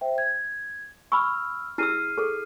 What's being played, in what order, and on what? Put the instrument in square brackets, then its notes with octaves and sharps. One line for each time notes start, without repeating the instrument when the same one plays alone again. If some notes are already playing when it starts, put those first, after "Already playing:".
[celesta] C5 E5 G5
G#6
[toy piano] B5 C#6 [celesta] E6 F6
[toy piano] E4 G#4 E6 [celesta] F6 C7 D#7
[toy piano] G#4 A4